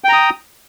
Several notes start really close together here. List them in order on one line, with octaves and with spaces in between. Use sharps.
G5 A#5 D#6